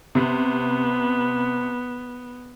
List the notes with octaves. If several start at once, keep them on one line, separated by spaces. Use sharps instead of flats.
C3 B3